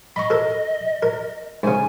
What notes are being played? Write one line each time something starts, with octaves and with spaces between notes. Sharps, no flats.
D#5 B5 C#6
A4 A#4
A#4
G#2 C#3 G#5